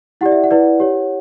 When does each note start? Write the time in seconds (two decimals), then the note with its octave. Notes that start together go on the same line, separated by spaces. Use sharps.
0.21 E4 G4 D5 F#5
0.32 E5
0.44 F#5
0.51 E4 B4 D5
0.80 G4 C#5